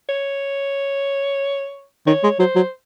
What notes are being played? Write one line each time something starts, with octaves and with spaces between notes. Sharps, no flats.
C#5
D#3 C#5
G#3
F#3 C5
F#3